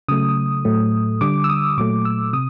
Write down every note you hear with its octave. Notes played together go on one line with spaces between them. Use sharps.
C#3 F#3 A3 D#6
A2 F#3 A3
D3 G3 D6
E6
D#6
A#2 F#3 A3 D6
E6
C3 D#6